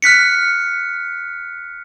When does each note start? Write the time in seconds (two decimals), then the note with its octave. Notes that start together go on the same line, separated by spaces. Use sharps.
0.02 F6 F#6 B6 C#7